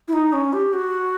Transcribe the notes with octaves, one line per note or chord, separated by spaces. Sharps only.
E4
D#4
C#4
G4
F#4